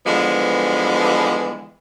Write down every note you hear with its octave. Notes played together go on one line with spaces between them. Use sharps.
D3 E3 F3 G3 G#3 B3